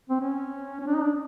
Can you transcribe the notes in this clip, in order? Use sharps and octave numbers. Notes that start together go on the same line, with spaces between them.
C4
C#4
C#4
D4
D#4
D4